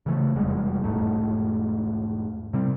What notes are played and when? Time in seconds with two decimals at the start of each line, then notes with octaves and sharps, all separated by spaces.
0.06 C#3 E3 A3
0.35 F1 E2 G3 G#3
0.84 E1 G#2 A3
2.53 C3 G3 C4